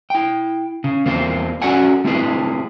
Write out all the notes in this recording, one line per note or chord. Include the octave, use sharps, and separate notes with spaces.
E4 G5
C#3
E2 A#3 C4 F4
C#4 F#4 A4 D5 F#5 G#5
A3 C4 E4 F4 G#4 B4